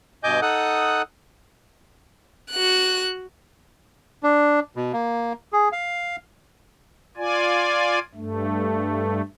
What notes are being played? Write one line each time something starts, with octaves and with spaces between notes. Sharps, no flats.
G2 B2 D#5 G#5 D6 G6
D#4 A4 F#5 D#6 F#6
F#4 F#6
D4
B2
A#3
G#4
F5
F4 D5 G#5
G2 A3